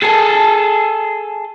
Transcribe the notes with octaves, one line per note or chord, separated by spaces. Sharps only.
G#4 A4